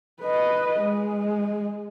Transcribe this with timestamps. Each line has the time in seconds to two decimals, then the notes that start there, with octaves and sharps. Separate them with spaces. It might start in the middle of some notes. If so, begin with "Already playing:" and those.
0.23 B4 D#5
0.81 G#3